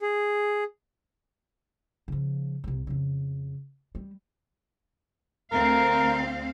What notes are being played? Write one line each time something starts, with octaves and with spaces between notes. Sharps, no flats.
G#4
C#3 F3
C2 C3
F2 C#3
G3
D2 C4 A#4 F5